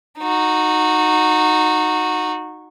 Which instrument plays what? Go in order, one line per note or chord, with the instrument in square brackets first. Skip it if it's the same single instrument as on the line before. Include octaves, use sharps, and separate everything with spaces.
[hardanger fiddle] D#4 F#4